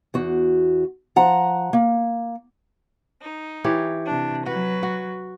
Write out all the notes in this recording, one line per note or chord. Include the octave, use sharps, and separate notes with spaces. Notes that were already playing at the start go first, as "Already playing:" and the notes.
E2 F#4
F3 F#5 A#5
A#3
D#4
E3 G4 C#5
C3 D4
F#3 F#4 B4
F#4